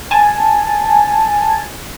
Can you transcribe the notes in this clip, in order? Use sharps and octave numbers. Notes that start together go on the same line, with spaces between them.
G#5 A5